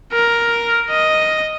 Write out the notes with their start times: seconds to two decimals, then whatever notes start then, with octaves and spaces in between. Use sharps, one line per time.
0.13 A#4
0.90 D#5